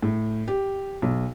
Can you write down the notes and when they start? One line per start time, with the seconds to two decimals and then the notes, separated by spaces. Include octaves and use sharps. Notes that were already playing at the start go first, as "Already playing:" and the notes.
0.03 A2
0.48 G4
1.02 B1